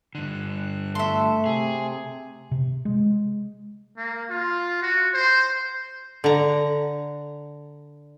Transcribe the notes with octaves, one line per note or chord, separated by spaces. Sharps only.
G2 D3 F#6
A3 A4 E5 C6
C3 G#4
C3
G#3
A#3
F4
F#4
C5
D3 A#5